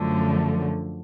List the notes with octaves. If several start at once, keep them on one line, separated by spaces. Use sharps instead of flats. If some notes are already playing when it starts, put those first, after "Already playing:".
Already playing: F#2 D3 F3 A3